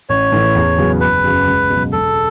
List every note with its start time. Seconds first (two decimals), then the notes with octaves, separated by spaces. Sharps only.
0.09 A1 C#5
0.32 A2 E3 A3 E4
0.55 E2
0.78 C#3 F#3 B3
1.01 F#1 B4
1.24 F#2 C#3 F#3
1.47 C#2
1.70 B2 F#3
1.92 E1 A4